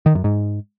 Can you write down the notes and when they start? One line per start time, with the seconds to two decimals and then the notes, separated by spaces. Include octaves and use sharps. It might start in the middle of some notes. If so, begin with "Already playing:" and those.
0.06 D#3
0.15 F#2
0.24 G#2